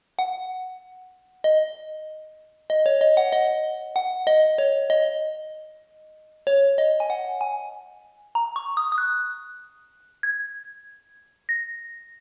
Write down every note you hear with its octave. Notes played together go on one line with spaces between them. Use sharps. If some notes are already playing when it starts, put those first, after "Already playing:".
F#5
D#5
D#5
C#5
D#5
F#5
D#5
F#5
D#5
C#5
D#5
C#5
D#5
G#5
F#5
G#5
A#5
C#6
D#6
D#6
F#6
G#6
A#6